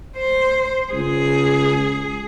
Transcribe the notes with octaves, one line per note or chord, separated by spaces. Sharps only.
C5
C#2 G#4